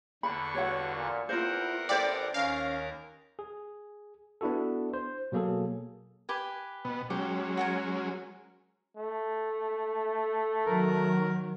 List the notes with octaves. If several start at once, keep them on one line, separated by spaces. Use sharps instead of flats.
E2 D3 B5 C#6
G2 F#4 C#5 F#5
A#2
E2 C4 F4 A#4 C5 F#5
A1 C5 D5 E5 G5
D#2 C#4 A#4 F5
G#4
B3 D4 E4 F#4 A4
C5
B2 F#3 A#3 G#4 A4
G4 B4 G#5
B2 B3
F#3 G#3 C#4 G4
F#4 A#4 G#5
A3
D#3 F#3 A#4